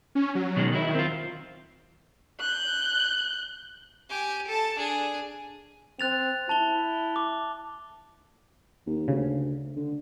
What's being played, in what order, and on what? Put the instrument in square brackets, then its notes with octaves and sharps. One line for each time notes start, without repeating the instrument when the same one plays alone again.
[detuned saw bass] C#4
F#3
[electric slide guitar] B2 D#3 G#3
[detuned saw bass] D#3 [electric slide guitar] F#3 E4
[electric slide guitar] C4 F4
[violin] F#6 G6
[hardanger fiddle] G4 G#5
A4 A5
D4 G#4
[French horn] C4 [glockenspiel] F#6 A6 F7
[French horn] E4 [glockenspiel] A5 F7 G7
[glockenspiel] D6
[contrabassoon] D#2
[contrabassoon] D2 [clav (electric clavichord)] C#3
[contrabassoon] D3